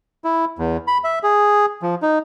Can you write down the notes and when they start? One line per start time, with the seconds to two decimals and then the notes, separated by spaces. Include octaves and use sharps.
0.24 E4
0.59 E2
0.87 B5
1.04 E5
1.23 G#4
1.82 F3
2.02 D#4